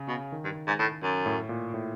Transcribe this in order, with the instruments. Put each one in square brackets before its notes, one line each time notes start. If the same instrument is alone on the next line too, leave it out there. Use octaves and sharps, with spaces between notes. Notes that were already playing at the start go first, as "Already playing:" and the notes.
Already playing: [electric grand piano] C#3
[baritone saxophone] B2
[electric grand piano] D#3
[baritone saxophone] G2
G#2
A2
F#2
[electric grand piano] A2
A#2
A2